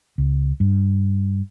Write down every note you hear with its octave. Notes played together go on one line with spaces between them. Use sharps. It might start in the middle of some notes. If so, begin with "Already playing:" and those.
C#2
G2